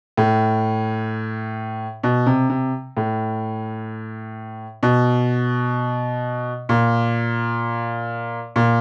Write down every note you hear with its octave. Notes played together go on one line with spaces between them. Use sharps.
A2
B2
C3
C3
A2
B2
A#2
A#2